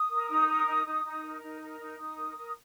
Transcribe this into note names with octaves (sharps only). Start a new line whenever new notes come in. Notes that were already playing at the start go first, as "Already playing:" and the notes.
Already playing: D#6
A#4
D#4
A#4
D#4
D#4
D#4
A#4
D#4
A#4
D#4
D#4 D#6
A#4
A#4